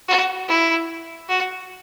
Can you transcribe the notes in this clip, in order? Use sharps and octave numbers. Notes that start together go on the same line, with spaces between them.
F#4
E4
F#4